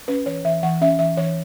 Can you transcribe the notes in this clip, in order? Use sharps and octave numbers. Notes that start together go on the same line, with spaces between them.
C#4 B4
E3 C#5
E3 E5
E3 F#5
C#4 E5
E3 E5
E3 C#5